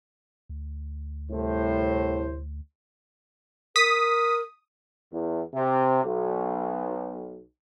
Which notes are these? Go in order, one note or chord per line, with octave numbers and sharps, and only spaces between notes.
D2
C2 A2 C5
A#4 D#6 B6
E2
C3
B1